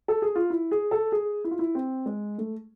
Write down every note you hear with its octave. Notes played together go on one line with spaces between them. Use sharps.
A4
G#4
F4
E4
G#4
A4
G#4
E4
F4
E4
C4
G#3
A3